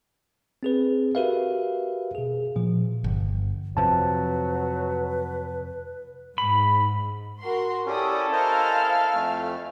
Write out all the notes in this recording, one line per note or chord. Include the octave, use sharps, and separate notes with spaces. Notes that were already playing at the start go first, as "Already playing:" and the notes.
C4 G#4 B4
F#4 G4 A#4 B4 E5 F5
B2 G#4
A#2 F3
G1
F2 C3 F3 F#3 B4 A5
G#2 B5
F#4 A#4 C6
C#4 E4 G4 A4 D5 D#6
A#4 C5 D#5 F5 G#5 F6
F2 A3